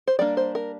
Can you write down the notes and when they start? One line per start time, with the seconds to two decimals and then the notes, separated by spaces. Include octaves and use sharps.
0.07 C5
0.19 G3 A#3 D4 D5
0.37 C5
0.55 A#4